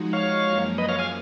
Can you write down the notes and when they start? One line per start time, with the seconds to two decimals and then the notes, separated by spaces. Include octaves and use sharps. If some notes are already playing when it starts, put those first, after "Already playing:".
Already playing: F3 G#3 D#4 F#4
0.13 C#5 F5
0.45 F#2 F3 A#3 C#4 G#4
0.78 B4 D#5
0.89 C#5 F5
0.99 F5 G#5